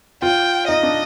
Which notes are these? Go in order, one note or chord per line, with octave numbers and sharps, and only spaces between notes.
F4 G5
D#4 D#5
D4